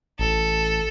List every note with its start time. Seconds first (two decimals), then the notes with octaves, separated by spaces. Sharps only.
0.19 A1 A4